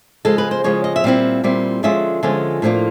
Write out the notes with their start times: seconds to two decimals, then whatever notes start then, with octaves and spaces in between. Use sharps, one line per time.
0.25 C#3 F3 G#3 A4
0.38 B4
0.51 C5
0.64 C#3 F3 G#3 C#5
0.84 D#5
0.96 E5
1.04 A#2 G3 C4 E4 F5
1.44 A#2 G3 C4 E4
1.83 D3 F3 G#3 C#4 F4 E5
2.23 D3 F3 G#3 C#4 F4
2.62 A2 F3 A#3 D4 F4